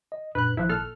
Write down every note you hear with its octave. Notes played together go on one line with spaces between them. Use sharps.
D#5
F#2 A#2 D4 B4 F#6
G#1 F3 E4 F#6
A#2 A4 F6